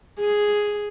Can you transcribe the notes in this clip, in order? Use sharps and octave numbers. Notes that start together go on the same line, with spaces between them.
G#4